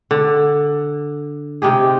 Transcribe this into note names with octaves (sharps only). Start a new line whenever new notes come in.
D3
C3 D#4 G4 G#4